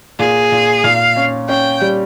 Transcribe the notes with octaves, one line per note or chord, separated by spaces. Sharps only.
A#2 G#4
A#2
A#2 F5
C#4
C#4 G5
G3